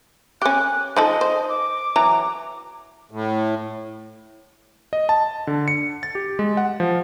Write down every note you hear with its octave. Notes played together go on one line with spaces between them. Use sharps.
C#4 G4 F#6
F3 D#4 A4 D#5
C5
D6
E3 F#3 A#5
A2
D#5
A5
D3
C#7
A6
G4
G#3
F#5
F3